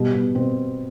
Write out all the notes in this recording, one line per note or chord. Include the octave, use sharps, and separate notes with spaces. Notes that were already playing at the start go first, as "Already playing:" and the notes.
Already playing: B2 G3
B2 B3
B2 C4